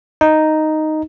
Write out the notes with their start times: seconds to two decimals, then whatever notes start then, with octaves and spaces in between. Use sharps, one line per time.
0.21 D#4